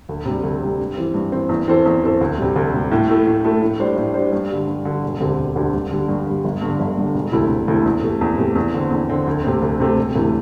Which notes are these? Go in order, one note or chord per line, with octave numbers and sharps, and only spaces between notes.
D2
C3 G3
D2
C3 G3
G2
E3 C4
G2
E3 C4
E2
E3 C4 A4 C5
E2
E3 C4 A4 C5
D2
C3 G3
D2
C3 G3
A2
A3 E4 A4
A2
A3 E4 A4
A2
G3 D4 C5
A2
G3 D4 C5
G2
D3 G3
G2
D3 G3
E1
D2 D3 C4 G4
E1
D2 D3 C4 G4
G2
D3 G3
G2
D3 G3
G1
G2 D3
G1
G2 D3
E1
D2 C3 A3 E4
E1
D2 C3 A3 E4
E2
C3 A3
E2
C3 A3
E2
D3 C4
E2
D3 C4
D2
C3 A3 C4
D2
C3 A3 C4
E1
D2 C3 E3 A3